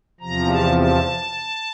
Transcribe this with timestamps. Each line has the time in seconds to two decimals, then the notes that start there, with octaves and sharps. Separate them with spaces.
0.21 E2 C3 F3 A#5
0.49 A5
0.77 A5